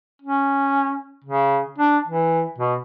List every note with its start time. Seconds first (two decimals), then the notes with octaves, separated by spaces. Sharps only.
0.22 C#4
1.24 C#3
1.78 D4
2.07 E3
2.58 B2